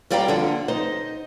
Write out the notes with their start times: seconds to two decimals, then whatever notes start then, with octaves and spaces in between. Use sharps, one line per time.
0.10 F#2 G3 D5 F5 G5 A#5
0.28 D3 F3 A#3 D4 F#5
0.68 D#4 C5 D#5